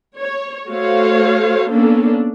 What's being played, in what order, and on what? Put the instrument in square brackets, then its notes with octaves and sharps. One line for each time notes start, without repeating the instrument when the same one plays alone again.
[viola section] C#5
A3 F#4 C5 C#5 F5
A#3 B3 C#4 D4 A4